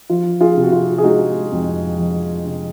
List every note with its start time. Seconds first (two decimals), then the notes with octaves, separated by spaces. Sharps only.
0.10 F3 F4
0.41 F4 G#4
0.57 C3
0.63 F#4
0.72 F4
0.98 G#4
1.03 G#3 D#4 F#4
1.52 F2
1.99 F3
2.45 C3